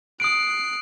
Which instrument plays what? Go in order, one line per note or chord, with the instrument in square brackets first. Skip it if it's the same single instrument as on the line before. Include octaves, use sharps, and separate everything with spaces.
[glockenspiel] D#6 D7 [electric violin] F#6 C7